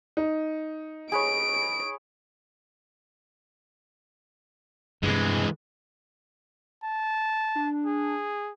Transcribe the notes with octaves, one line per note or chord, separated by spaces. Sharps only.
D#4
G#4 B4 C#5 D7
G2 C3 E3 G#3
A5
D4
G#4